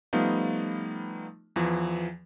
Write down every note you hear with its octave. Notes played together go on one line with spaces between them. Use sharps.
F3 G3 A3 B3 D#4 F4
E2 E3 F3